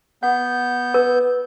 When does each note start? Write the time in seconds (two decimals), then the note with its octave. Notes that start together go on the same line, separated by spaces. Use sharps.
0.23 B3 F#5 G6
0.94 B4